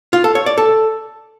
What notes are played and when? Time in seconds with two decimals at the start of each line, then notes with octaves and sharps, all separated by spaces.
0.13 F4
0.24 A4
0.35 C#5
0.46 D5
0.58 A4